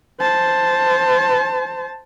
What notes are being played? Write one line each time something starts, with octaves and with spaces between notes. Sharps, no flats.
C5 A5